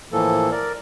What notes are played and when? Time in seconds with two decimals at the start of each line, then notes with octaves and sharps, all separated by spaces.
0.12 A2 E3 F3 A#3 A4
0.51 A#4 D5